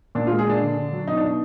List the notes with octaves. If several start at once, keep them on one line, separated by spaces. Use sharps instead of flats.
A#2 D4
G#3 F4
G#4
A#2 D4
D3
D3
F#3
B2 D#4
D4
B2 D#4